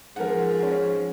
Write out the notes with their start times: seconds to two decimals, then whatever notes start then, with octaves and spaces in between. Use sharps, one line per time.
0.16 G#2 F3 A#4 F#5
0.63 C#4